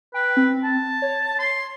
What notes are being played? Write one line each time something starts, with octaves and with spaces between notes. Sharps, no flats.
B4 G5
C4
A5
C#5
C6